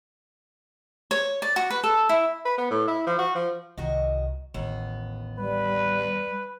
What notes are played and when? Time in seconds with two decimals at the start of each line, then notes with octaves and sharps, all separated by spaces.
1.11 C#5
1.42 D5
1.56 F#4
1.70 B4
1.84 A4
2.09 E4
2.46 B4
2.58 B3
2.71 A2
2.88 E4
3.07 F3
3.18 F#4
3.35 F3
3.78 C2 D#3 F#4 D#5
4.54 A1 D#2 B3
5.38 G3 B4